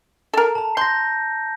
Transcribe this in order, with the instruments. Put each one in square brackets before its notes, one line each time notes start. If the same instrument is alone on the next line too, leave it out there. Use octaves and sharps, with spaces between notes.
[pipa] A4 A#4
[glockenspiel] A5 A#5
[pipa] C6 [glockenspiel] G6 A#6